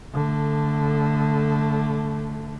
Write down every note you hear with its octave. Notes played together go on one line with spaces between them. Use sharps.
D3 A3